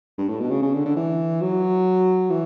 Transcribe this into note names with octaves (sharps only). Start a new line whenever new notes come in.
G2
A2
B2
C#3
C#3
D3
D3
E3
F#3
E3